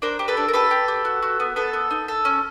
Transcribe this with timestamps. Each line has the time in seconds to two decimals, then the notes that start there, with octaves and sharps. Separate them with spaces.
0.02 D4 A#4 C5
0.19 G4
0.28 A4 B4
0.37 D4
0.48 A#4
0.53 G4 A4 B4
0.71 G4
0.88 G4
1.05 F#4
1.22 F#4
1.40 B3
1.56 B3 A4
1.73 B3
1.90 D#4
2.08 A4
2.25 C#4